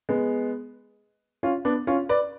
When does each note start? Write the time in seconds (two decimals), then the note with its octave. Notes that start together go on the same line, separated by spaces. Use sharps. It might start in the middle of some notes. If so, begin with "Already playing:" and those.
0.09 G#3 B3
1.43 C#4 F4
1.65 B3 D4
1.87 C#4 F4
2.09 B4 D5